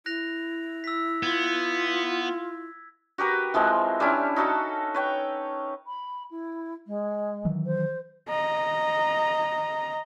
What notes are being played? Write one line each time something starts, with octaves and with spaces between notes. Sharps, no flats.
E4 F#6 A#6 F7
E6 B6
B3 F4 G#6
F#4 G4 A#4 B4
E3 F3 G#3 C4
G3 C#4 D4 E4
D#4 F#4 A4 E5
B4 C#5 G5
B5
E4
G#3
D#3 E3 F#3
C5
D#5 A#5